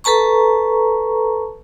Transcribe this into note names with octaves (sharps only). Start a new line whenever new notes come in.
A4 B4 A5 A#5 C#6